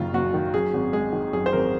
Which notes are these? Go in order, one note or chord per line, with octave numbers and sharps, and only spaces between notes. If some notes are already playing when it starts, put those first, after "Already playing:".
Already playing: F#1 F#2 D#3 F4
F#1 F#4
D#3
F#2 G#4
G#1
G#3 G#4
D#3
F#2 G#4
C5
G#1 A#4